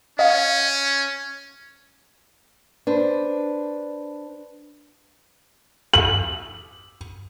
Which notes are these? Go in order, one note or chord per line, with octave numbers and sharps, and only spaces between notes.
C#4 D#5 F5
D4 B4 C5
F#7